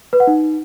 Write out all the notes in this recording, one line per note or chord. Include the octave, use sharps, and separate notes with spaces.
B4
F#5
D#4